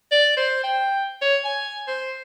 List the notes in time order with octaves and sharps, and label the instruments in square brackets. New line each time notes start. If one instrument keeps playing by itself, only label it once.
[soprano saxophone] D5
C5
G5
C#5
G#5
C5